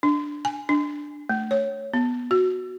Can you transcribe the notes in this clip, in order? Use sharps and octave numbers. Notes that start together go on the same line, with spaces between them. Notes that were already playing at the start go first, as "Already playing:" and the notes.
D4
G#5
D4
A3
C#5
B3
F#4